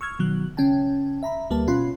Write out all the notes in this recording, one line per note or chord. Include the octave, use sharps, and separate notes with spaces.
C#6 E6 F6 G#6
B2 D#3 F#3 F#6
C#3 C#4 G5 A5
E5 A#5 B5
D2 G3 A#3 B4 A5
B2 C#4 F4 B5 C6 F#6